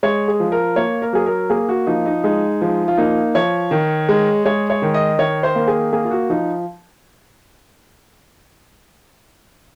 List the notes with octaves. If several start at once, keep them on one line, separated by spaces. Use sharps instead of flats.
G#3 C#5
G#4
F3
A#4
A#3 C#5
A#4
F#3 G#4
A#4
A#3 G#4
F#4
F3 D#4
D#4
G#3 D#4
F3
F4
A#3 D#4
F3 C#5
D#3
G#3
G#3 C#5
C#5
D#3
D#5
D#3 C#5
C5
A#3
G#4
A#3 G#4
F4
F#4
F3 D#4